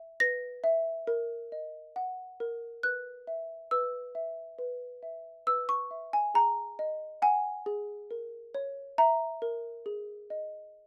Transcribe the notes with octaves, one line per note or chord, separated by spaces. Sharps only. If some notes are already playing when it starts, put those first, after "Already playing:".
Already playing: E5
B4 A#6
E5
A#4
D#5
F#5
A#4
B4 F#6
E5
B4 E6
E5
B4
E5
B4 E6
C#6
E5
G#5
G#4 A#5
D#5
F#5 G#5
G#4
A#4
C#5
E5 A#5
A#4
G#4
D#5